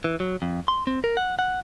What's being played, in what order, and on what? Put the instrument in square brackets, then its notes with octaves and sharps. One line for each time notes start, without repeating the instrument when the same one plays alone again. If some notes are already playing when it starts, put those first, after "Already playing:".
[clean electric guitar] E3
F#3
F2
C6
C4
A#4
F#5
F#5